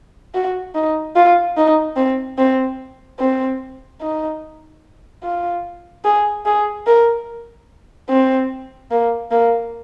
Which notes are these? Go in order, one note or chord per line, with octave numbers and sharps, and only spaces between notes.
F#4
D#4
F4
D#4
C4
C4
C4
D#4
F4
G#4
G#4
A#4
C4
A#3
A#3